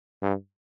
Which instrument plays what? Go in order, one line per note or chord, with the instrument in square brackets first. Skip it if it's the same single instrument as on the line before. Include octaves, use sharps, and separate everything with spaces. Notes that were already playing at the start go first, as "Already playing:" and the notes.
[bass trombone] G2